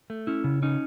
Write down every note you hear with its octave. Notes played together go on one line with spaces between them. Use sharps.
A3
C#4 E4
C#3
C#4 D#4